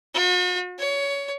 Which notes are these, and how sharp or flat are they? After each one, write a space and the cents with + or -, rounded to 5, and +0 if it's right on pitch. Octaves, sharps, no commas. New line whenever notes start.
F#4 -45
C#5 +20